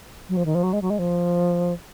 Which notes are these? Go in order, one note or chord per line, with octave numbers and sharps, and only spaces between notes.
F#3
F3
D#3
F3
F#3
G#3
F#3
G#3
F3